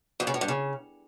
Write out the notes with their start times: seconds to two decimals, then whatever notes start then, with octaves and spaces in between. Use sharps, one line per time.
0.20 F2
0.27 C#3
0.34 A2
0.41 G2
0.48 C#3